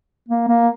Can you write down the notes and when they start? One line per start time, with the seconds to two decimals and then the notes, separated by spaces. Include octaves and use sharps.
0.29 A#3
0.48 A#3